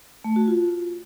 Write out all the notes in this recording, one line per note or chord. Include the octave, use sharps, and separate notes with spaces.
A3
F#4
F4